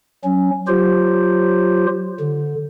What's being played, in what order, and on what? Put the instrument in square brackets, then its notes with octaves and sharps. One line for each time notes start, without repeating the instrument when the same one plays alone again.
[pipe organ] F#3 C#4
F#3 F4 G4 C5
D3